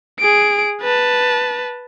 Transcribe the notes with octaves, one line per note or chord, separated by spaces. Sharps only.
G#4 D7
B4 A5